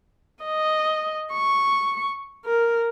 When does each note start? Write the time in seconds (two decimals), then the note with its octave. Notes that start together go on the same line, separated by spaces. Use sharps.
0.44 D#5
1.33 C#6
2.46 A#4